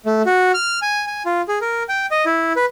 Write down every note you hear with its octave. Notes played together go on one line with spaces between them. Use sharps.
A3
F#4
F6
G#5
G#5
F4
G#4
A#4
G5
D#5
E4
B4